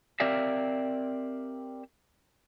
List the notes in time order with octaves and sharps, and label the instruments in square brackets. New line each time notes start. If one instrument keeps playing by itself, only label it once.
[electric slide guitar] C4 G4 A#4 D5 E5 F5